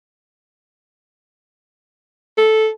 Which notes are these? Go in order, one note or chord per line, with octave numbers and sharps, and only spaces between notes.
A4